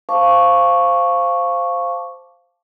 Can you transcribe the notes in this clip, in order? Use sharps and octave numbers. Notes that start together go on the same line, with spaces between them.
C5 F5 A5 C#6 D6